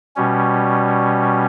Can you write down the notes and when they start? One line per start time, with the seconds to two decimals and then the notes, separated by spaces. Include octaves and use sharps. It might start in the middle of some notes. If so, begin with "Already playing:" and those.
0.16 B2 G3 C#4